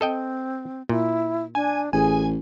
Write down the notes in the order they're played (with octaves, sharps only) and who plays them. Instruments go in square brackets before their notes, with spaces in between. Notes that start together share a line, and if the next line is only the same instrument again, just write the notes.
[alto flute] C4 [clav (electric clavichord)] A4 D#5 G5
[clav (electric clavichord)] A#2 [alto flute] E4
[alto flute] D4 [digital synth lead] G#5
[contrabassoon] A1 [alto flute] G#4 [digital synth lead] G#5